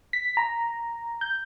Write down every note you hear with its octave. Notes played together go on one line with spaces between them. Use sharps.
B6
A#5
G6